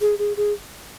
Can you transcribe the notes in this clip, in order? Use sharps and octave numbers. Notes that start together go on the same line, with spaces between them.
G#4
G#4
G#4